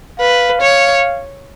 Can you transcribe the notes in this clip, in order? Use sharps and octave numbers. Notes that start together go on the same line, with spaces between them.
B4 F5
C#5